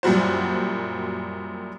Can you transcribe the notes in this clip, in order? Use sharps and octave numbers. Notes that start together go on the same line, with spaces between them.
F#2 A#2 G3 F#4 C5